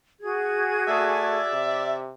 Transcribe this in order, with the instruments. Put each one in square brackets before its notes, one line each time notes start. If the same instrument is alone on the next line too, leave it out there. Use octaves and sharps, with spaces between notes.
[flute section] F#4 G#4 G#6
[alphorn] A3 [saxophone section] D5 E5
[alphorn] C3